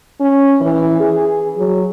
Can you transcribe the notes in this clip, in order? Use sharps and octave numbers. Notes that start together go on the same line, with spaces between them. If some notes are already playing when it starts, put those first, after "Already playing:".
C#4
E3
G#4
F#3